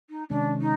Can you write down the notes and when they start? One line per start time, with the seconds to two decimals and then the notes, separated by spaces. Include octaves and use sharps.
0.10 D#4
0.30 C3 D#3 G#3 C#4 D4
0.61 D#4